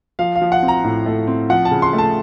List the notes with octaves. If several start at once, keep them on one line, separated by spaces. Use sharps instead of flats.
F3 F5
F5
F3
F#5
C4
A#5
A2
A3
C4
F3 F#5
A5
C#3
C6
A3 A5